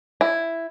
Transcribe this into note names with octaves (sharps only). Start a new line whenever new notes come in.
E4